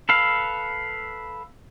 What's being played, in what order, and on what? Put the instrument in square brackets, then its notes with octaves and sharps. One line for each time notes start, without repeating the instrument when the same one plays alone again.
[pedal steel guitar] A4 B4 F5